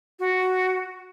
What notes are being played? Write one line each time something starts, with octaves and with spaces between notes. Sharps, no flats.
F#4